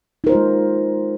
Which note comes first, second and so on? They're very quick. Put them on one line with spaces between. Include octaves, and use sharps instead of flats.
D#4 A#4 C5 F4 G#3